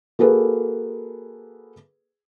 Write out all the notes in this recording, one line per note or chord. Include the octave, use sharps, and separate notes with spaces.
A#3 F#4 G#4 A4 B4